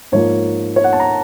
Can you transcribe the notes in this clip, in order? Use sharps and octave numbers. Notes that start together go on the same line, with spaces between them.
G#2 F3 A#3 C#5
C#5
F#5
A5
A#5